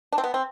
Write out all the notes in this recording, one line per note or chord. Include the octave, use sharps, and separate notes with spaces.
D4
C4
B3
C4